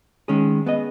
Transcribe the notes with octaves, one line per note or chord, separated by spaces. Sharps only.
D#3 G#3 C#4 G#4
B3 G#4 D#5